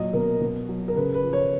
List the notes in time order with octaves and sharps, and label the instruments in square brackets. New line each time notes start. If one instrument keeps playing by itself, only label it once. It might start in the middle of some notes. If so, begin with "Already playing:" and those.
Already playing: [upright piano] A#2 F#3 D#5
B2 A#4
B2
F#3
A#4
C#3 B4
B4
F3
C#5